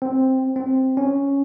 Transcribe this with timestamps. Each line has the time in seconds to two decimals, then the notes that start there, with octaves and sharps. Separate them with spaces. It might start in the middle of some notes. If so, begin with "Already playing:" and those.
0.02 C4
0.56 C4
0.97 C#4